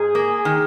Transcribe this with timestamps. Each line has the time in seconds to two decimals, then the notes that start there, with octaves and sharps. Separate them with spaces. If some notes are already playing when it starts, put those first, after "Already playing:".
Already playing: G#2 G#4
0.15 A#3
0.45 D#3